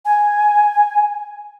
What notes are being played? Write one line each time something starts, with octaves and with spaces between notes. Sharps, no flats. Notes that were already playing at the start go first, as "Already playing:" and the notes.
G#5